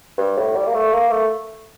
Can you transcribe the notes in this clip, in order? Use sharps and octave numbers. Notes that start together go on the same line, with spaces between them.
G2
A2
G3
A#3
A3
A#3
A3